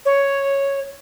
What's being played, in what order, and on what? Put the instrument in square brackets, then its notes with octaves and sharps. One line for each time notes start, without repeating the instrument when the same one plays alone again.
[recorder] C#5